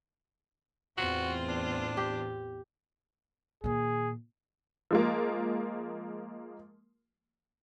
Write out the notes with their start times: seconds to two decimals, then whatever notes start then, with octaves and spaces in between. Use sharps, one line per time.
0.98 E2 A2 C4 F4 F#4
1.48 D4
1.97 G4
3.64 A#2 D#3 G#4
4.91 F3 G#3 A#3